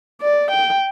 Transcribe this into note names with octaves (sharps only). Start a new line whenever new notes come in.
D5
G5